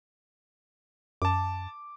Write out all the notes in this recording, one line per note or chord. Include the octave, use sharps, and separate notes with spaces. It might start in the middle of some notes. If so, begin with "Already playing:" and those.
F#2 A5 D6